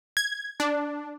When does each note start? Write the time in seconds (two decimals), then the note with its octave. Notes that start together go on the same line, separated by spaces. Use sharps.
0.17 G#6
0.60 D4